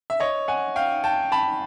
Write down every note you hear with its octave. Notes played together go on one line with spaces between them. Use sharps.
E5
C#5 D#5
F#5 G#5
F5 G5
G5 A5
A5 B5